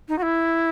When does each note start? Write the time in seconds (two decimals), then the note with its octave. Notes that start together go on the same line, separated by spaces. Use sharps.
0.08 D#4
0.18 F#4
0.22 E4